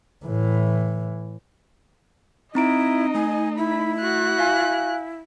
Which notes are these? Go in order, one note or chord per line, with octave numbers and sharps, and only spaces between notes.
A2 E3
C4 D#4 E4 D#5 A#5 D7
A3 G#5
E4 B5
F#4 F#6
F5 G#5